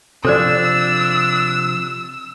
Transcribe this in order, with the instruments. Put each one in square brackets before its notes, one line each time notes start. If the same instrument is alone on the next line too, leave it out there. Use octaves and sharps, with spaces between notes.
[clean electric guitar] C3 F3 [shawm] D4 [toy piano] A4 C5 D5 [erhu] E6